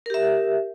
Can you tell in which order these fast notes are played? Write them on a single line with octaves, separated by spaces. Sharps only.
A#4 G4 E5